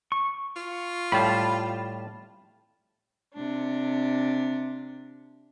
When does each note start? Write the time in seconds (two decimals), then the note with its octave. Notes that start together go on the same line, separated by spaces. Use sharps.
0.12 C#6
0.56 F4
1.12 A2 G3 F5 A5 B5
3.34 C3 D4